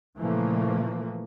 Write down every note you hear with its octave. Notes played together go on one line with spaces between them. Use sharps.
A#2 C#3 E3 F3 A3 A#3